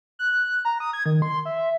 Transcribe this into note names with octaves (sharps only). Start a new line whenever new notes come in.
F#6
A#5
D#6
G#6
D#3
C6
E5